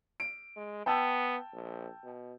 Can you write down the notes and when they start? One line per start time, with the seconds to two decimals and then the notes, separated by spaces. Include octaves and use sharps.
0.20 D7
0.56 G#3
0.86 B3 G5 A5 E6
1.53 A#1
2.04 B2